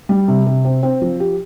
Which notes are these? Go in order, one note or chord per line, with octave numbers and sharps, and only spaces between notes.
G3
C3
C3
C4
C4
F3
G4